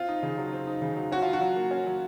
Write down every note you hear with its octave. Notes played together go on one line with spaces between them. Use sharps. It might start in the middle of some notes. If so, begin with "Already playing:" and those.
Already playing: C4 F4
D#4
C#3
F#3
C4
D#4
C#3
F#3
C#4 F#4
F#3 F4
F#4
F#3
A#3
C#4
F#3